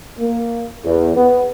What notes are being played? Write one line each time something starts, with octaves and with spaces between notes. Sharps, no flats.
A#3
E2
B3